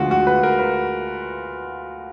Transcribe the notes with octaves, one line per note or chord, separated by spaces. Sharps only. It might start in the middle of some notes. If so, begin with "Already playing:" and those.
Already playing: D2 D3 F3 G#3 F4 F#4
F#4
B4
A#4
B4